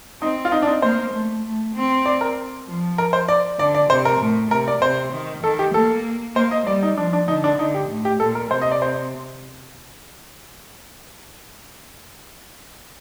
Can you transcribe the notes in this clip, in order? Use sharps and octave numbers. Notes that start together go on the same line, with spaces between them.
C4 D#4
F4
D#4
D4
D#4
A#3 C5
A3
A3
C4
D5
A#4
F3
A#4
C5
D5
D3 D5
D5
C3 C5
A#4
A2
C3 A#4
D5
C3 C5
D#3
D#3 A4
G4
A#3 A4
A#3 C5
D#5
G3 D5
D#4
F3 D4
D4
D3 D#4
D4
D3 D#4
G4
A2
G4
A#2 A4
A#4
C3 C5
D#5
D5
C5